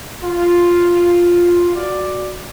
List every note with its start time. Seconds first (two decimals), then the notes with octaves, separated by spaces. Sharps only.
0.22 F4
1.76 F#4 D5